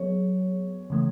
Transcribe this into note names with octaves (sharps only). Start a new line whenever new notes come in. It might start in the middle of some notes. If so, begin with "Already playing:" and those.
Already playing: F#3 B3 G#4 C#5
C#3 E3 A3